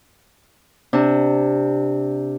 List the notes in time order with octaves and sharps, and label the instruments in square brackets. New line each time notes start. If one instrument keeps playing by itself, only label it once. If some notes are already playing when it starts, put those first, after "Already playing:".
[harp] C3 D4